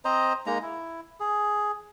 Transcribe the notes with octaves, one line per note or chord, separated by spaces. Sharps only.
C4 C5 D#5 A#5
G#3 A#3 D#4 A#5
E4
G#4